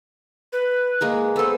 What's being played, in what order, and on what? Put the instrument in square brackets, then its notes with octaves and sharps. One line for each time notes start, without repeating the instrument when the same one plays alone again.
[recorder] B4
[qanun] G#3 A#3 G#4
[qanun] B3 C5 [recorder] A4